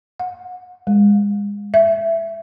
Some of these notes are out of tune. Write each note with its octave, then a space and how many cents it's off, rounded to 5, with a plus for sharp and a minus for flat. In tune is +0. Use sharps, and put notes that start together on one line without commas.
F#5 -30
G#3 -30
E5 +15